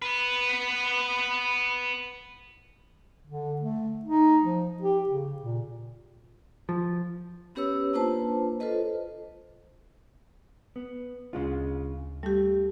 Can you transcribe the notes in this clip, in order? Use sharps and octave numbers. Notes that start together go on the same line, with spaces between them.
B3 B4
D3
A3
D#4
F3
G4
C#3
A#2
F3
B3 C#4 G4 B4 C#5 E6
A#3 D4 F4 B4 C5 A5
F4 A4 B4 C5 D#5
B3
D2 C#3 G#3 F4
G3 A3 G4